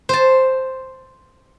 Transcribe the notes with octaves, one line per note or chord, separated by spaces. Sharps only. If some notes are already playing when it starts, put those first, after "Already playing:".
C5 A5